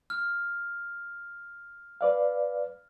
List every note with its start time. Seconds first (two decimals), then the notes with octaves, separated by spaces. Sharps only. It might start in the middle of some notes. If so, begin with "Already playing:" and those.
0.10 F6
2.01 B4 D5 F5